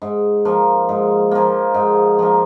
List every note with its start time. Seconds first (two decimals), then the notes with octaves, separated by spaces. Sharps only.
0.02 G#2
0.45 F3 A#3
0.89 G#2
1.31 F3 A#3
1.74 G#2
2.19 F3 A#3